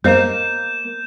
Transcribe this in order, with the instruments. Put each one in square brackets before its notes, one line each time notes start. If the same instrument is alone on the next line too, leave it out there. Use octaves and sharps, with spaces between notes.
[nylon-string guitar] A#3 A#4 [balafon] C5 D#5 F5 [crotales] G6 E7